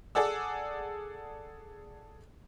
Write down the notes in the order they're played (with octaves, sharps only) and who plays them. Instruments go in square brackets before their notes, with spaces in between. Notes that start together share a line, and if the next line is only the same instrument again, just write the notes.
[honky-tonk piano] G#4 A4 D5 F#5 E6